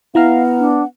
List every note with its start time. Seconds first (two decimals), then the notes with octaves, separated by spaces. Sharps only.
0.15 B3 E4 F5 F#5 A#5 F6
0.59 D4